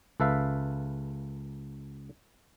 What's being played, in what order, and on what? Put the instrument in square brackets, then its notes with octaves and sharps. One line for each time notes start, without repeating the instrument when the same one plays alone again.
[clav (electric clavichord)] C#2 A4 B4 E5 F5